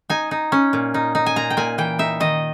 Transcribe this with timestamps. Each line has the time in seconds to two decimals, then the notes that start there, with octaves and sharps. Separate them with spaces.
0.10 D#4 G#5
0.31 D#4
0.52 C#4
0.73 A#2
0.94 D#4
1.15 D#4
1.26 G#5
1.36 A#2 A#5
1.50 G5
1.57 A#2 G#5
1.78 E3 G5
1.99 D#4 E5
2.20 D#3 D#5